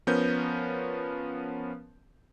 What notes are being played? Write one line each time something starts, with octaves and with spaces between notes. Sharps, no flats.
F3 B3 C#4 A#4 G6